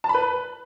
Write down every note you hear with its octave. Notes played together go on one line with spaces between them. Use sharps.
A5
B5
B4